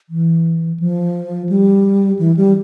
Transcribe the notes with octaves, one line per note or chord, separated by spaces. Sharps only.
E3
F3
G3
E3
G3